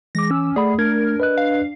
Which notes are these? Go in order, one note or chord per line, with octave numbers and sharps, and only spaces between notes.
E3 G#3 D6 A#6
C#4 E6
A3 G#4 D5 F#5 B5
A3 D4 A#4 G#6
B4 D#5 F#6
F5